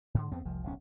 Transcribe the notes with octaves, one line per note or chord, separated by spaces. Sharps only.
G#2 D3
E2 B3 C4
F1 C2 F3
D1 B1 C#4